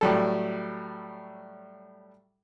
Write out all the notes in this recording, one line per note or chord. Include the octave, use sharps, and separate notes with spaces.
A2 F#3 G3 A4